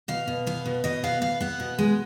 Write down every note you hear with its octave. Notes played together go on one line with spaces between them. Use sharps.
B2 F5
B2
B3 F5
B2
B2 D#5
B3 F5
B3 F5
B3 F#5
B2
G#3